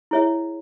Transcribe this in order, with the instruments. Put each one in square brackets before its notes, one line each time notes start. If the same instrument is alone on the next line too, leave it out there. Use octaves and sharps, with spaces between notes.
[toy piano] E4 G#4 C#5 E5